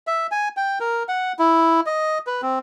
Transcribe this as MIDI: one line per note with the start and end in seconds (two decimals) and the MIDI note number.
0.07 0.27 76
0.31 0.49 80
0.57 0.79 79
0.80 1.03 70
1.09 1.32 78
1.39 1.81 64
1.86 2.18 75
2.27 2.41 71
2.42 2.59 60